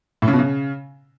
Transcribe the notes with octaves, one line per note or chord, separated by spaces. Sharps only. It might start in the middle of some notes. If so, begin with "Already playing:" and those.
A2
C#3
B2
C#3